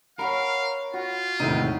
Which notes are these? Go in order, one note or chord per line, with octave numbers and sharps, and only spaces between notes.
A#4 C#5 F5 F#5 B5 C6
F4 F#4
E1 A2 C3 D#3 D#4 E4 B4 D#7